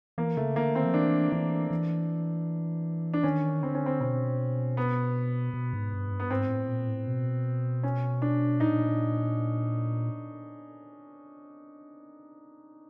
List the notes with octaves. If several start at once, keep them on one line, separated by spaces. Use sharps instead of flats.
E3 A#3
C#3 A3
D3 A#3
D#3 C4
F3
E3 D4
E3 D4
E3
D4
D#3 C#4
D3 C4
C#4
C4
B2 C4
B3
B2
G#2
G2
G#2
G2
B3
G#2 C4
A2
A#2
A2
B2
C#4
D4
A#2 D#4